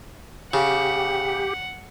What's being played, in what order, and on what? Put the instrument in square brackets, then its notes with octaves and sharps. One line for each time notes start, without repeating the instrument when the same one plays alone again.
[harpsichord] C#3 [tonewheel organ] G4 [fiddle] F#5